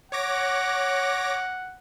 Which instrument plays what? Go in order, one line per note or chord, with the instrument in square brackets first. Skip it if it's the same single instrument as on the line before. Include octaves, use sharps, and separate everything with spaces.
[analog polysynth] C#5 D6 A#6 [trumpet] F#5